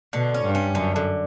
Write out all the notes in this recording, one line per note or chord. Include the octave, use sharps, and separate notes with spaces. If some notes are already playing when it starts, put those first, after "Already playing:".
B2 D3
C#4
G2
C#4
F#2 D3
D3